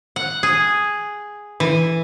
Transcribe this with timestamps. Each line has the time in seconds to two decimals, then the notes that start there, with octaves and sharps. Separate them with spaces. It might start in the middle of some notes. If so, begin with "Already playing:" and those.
0.16 F#5
0.43 G#4
1.60 E3